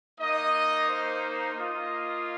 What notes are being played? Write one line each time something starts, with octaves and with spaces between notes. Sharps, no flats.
A#3 D#4 D#5
C5
A#3 F4 D#5